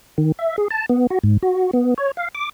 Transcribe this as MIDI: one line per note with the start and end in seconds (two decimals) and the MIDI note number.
0.18 0.32 51
0.39 0.56 76
0.58 0.68 68
0.71 0.86 81
0.89 1.07 59
1.10 1.19 66
1.24 1.38 44
1.43 1.71 66
1.73 1.94 59
1.98 2.11 73
2.17 2.28 77
2.35 2.49 86